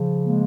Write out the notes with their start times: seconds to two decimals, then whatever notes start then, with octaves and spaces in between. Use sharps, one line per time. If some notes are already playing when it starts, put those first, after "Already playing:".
Already playing: C#3 F3
0.24 G#3 A#3